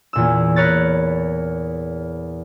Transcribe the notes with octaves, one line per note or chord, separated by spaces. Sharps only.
E2 A#2 E6
A#4 B4 C#5 F#6 A6